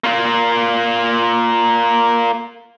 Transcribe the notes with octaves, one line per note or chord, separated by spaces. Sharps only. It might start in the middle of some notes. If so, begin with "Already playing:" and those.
A#3 F4